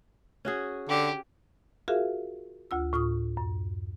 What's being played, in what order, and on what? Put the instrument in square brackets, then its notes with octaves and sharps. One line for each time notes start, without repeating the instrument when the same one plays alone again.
[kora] C#4 F#4 G#4
[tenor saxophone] D3 [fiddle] G4
[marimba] F4 F#4 G#4 A#4 E5 F5
D2 F4 E6
A2 F4 C#6 D#6
F#2